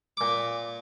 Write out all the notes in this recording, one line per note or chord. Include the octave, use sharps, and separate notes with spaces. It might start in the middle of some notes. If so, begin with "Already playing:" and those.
A#2 D6